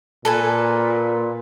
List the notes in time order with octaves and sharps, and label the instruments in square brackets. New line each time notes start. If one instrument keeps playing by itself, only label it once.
[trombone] A#2 [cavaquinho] A4 B4 G#5